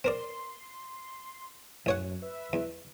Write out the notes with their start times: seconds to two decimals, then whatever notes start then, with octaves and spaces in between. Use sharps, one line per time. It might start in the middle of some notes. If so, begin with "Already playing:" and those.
0.04 C4 A#4 D5 C6
1.86 A1 F#2 C#5 F#5
2.22 B4 E5
2.53 E2